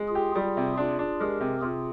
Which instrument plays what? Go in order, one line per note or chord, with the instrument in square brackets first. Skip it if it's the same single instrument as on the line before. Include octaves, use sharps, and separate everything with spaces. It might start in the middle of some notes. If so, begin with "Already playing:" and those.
Already playing: [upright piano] G#3
[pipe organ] F4 G#4
[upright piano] G4
[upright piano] G3 [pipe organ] F4 G#4
[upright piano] C3
[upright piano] D4 [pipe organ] F4 G#4
[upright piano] D4
[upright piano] G#3 [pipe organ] G4 A#4
[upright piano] C3
[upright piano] C3 [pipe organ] F4 G#4